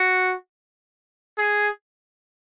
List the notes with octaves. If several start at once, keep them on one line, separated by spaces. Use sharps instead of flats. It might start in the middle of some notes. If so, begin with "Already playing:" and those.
Already playing: F#4
G#4